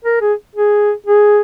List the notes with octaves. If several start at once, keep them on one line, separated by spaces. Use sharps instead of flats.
A#4
G#4
G#4
G#4